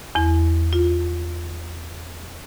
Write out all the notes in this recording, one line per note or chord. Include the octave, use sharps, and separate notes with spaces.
E2 E4
F4